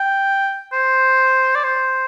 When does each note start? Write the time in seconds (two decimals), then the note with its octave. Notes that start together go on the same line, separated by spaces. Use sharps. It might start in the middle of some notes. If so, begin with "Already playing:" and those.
Already playing: G5
0.73 C5
1.55 D5
1.64 C5